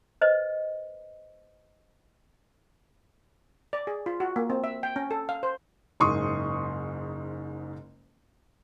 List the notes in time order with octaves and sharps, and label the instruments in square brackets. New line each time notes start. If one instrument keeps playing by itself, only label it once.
[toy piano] B4 C5 D#5
[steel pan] D5
G#4
F4
F#4
A#3
C4
E5
G5
C#4
A4
F5
C5
[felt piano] F#1 G#2 C6 C#6 D#6